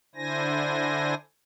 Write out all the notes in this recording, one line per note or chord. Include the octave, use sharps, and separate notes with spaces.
D3 D4 E4 C5 G#5 A#6